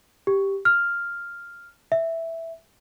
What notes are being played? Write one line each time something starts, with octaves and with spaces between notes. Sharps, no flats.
G4
F6
E5